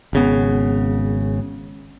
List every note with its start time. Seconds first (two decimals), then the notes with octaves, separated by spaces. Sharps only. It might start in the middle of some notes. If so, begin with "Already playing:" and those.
0.13 G#1 C#3 B3